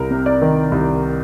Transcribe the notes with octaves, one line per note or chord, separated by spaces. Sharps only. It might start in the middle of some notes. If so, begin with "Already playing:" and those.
Already playing: C2 A#4
C3
D5
D#3
C2